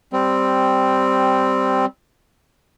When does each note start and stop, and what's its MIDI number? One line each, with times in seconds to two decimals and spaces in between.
0.13 1.86 55
0.13 1.86 60